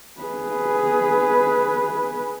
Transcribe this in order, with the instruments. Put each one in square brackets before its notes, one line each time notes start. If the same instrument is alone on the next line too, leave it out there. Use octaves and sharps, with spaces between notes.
[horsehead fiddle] G#4 B4